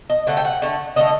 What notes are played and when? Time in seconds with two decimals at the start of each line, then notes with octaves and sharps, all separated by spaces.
0.10 D#5
0.27 D3 A3 F#5
0.37 G5
0.45 F#5
0.62 D3 A3
0.96 D3 A3 D#5